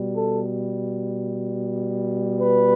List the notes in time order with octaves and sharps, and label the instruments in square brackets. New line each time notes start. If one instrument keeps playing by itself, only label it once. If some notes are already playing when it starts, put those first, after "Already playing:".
Already playing: [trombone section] B2 G3
A4
B4